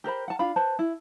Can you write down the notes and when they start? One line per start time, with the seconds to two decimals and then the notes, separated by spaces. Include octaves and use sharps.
0.04 G4 A#4 C5 B5
0.28 F#5 A5
0.39 D4 F4 F5 B5
0.56 B4 C5 A5
0.79 E4